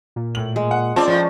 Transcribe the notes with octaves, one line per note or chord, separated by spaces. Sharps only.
A#2
A2 F#7
G#3
F#5
C4 C#4 F4 D5 A5
A2 F3